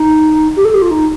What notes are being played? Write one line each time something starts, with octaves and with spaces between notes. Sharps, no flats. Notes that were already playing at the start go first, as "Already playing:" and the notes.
Already playing: D#4
G4
A4
G4
F4
D#4